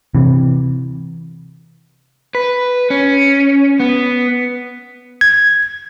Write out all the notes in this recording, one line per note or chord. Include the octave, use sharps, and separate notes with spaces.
C3 E3
B4
C#4
B3
G#6